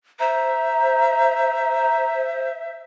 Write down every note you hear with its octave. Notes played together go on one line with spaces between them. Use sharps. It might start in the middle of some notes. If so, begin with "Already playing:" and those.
C5 E5 A#5